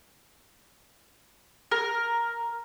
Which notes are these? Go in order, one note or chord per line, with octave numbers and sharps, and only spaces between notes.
A#4